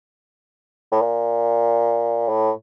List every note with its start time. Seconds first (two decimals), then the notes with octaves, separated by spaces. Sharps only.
0.92 A2
1.02 A#2
2.29 A2